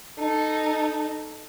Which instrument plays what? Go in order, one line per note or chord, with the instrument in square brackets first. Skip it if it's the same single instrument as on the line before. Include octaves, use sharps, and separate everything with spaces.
[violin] D#4 A4